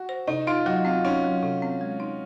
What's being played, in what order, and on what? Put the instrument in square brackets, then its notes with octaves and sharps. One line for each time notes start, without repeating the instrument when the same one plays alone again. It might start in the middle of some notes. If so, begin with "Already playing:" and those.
Already playing: [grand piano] F#4
[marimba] C5
[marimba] C3 [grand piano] D#4
[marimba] D#4 [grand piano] F4
[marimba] F#3 [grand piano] F#4
[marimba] C4 [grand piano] F4
[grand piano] C#4 [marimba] D#4
[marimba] F#3
C3
C4
G#3
D#4